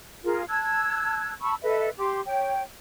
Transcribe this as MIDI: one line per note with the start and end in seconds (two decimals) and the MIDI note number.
0.24 0.43 65
0.24 0.43 68
0.24 0.43 70
0.48 1.31 81
0.48 1.31 88
0.48 1.31 90
0.48 1.31 92
1.42 1.55 81
1.42 1.55 83
1.42 1.55 85
1.42 1.55 88
1.62 1.89 69
1.62 1.89 71
1.62 1.89 75
1.62 1.89 76
1.98 2.21 67
1.98 2.21 84
1.98 2.21 86
2.26 2.62 73
2.26 2.62 79